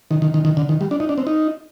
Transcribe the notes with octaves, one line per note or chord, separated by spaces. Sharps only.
D#3
D#3
D#3
D#3
D3
D#3
G3
D4
D#4
D4
C4
D#4